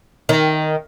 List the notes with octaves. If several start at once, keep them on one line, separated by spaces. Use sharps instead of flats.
D#3